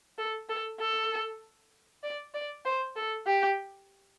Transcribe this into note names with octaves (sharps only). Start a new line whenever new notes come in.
A4
A4
A4
D5
D5
C5
A4
G4